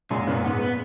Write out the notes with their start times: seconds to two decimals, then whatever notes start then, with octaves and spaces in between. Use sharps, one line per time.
0.10 F#2 A#2 G#3
0.27 F#2 A#2 B3
0.44 G#2 B3
0.61 B3